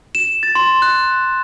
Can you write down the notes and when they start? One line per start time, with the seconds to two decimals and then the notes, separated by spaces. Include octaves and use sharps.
0.15 E7
0.43 A6
0.55 C6
0.82 F#6